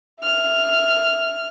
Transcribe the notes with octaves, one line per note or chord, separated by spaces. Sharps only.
E5 F6